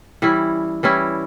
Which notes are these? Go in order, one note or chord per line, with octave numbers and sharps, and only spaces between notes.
E3 G3 C#4 E4
E3 G3 C#4 E4